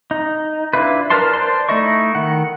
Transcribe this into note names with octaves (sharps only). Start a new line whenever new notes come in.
D#4
D4 E4 F4 B4
A#4 B4 D5 A5 C6
C5 D5 A5 C6
A3 D#4 E4 D#5 C#6
D#3 F#5